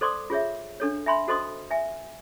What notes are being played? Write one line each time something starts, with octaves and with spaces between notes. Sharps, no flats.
A4 C5 D5 C6 D6 D#6
F4 G#4 C#5 E5
D4 A4 C#5
E5 G#5 B5 C6
F#4 A4 C5 D#5 C6 D#6
E5 G#5